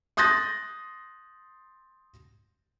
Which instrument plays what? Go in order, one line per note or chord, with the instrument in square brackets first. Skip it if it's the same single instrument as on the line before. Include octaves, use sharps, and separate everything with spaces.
[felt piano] C6 D#6 F#6 G6 A6 A#6